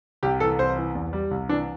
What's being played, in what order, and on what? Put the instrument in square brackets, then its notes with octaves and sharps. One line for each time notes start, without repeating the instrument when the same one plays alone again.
[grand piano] C2 G4
E3 A4
C2 C5
E3
E2
G3
C2
E3 D4